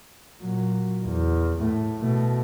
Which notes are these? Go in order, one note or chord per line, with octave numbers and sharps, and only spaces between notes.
A#2 F#3
E2
A2 A3
B2 A3